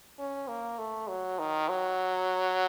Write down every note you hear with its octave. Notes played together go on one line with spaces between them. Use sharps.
C#4
A#3
A3
F#3
D#3
F#3